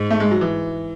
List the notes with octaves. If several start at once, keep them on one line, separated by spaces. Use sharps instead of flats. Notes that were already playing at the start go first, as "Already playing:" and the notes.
Already playing: G#2
A3
G#3
F#3
E3